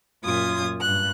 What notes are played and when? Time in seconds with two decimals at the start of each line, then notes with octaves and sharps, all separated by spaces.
0.23 F#2 A#2 F4 D#6 G#6
0.80 G2 F#6